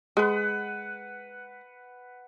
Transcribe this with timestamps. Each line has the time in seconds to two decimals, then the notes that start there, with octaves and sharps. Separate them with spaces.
0.17 G#3 B4 F#5